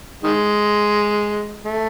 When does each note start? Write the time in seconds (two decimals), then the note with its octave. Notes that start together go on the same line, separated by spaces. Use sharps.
0.23 D#3 G#3
1.65 A3